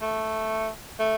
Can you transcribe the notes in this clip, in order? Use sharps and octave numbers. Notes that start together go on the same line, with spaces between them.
A3
A3